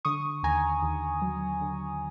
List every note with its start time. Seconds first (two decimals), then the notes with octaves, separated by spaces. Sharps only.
0.05 D3 C#6 D#6
0.43 D#2 G#5 A#5
0.82 D#2
1.22 F#3
1.61 D3